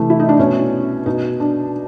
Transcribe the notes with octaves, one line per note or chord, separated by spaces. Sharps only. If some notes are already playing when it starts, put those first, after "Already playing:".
Already playing: C3 E3 A3
E4
D#4
D4
B2 C#4
B2 D#4
D4